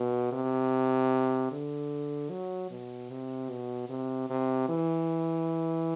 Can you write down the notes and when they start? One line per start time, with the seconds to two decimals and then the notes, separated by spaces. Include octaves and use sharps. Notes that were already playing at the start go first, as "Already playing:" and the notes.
Already playing: B2
0.32 C3
1.51 D3
2.30 F#3
2.70 B2
3.10 C3
3.50 B2
3.89 C3
4.30 C3
4.69 E3